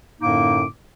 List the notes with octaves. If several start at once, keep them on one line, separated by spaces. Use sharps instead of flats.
F#2 A2 D3 A#3 D#4 D6